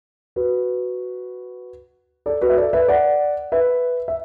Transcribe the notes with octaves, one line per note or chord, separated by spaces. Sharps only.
F#4 B4
A4 D5
F#4 B4
E5
A4 D5
B4 E5
D5 F#5
B4 E5
E5